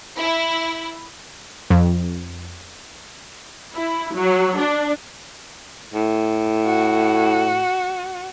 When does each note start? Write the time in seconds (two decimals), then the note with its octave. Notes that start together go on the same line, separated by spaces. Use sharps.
0.17 E4
1.70 F2
3.76 E4
4.15 F#3
4.60 D4
5.94 A2
6.66 F#4